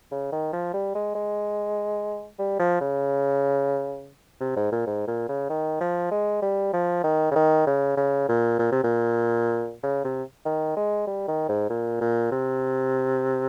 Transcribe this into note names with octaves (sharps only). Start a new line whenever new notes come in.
C#3
D#3
F3
G3
G#3
G#3
G3
F3
C#3
C3
G#2
A#2
G#2
A#2
C#3
D#3
F3
G#3
G3
F3
D#3
C#3
D#3
C#3
C#3
A#2
A#2
C3
A#2
C#3
C3
D#3
G#3
G3
D#3
G#2
A#2
A#2
C3